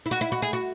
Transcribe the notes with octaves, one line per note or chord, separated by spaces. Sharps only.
E4
F#4
E4
F#4
G#4
F#4